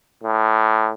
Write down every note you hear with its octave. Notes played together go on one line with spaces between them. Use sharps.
A2